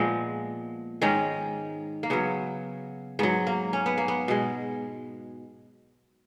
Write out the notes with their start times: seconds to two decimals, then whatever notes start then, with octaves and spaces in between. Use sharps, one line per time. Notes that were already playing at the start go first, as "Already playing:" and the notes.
Already playing: A#2 F3 G#3 B3
1.02 G#2 D#3 G#3 C#4
2.03 A#3
2.10 C#3 F#3 B3
3.19 G#2 F#3 B3
3.47 A#3
3.73 C#4
3.86 B3
3.98 A#3
4.08 B3
4.28 B2 G#3